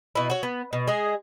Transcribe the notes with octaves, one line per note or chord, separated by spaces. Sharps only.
B2 E4
F#4 C#5
B3
B2
G#3 G#4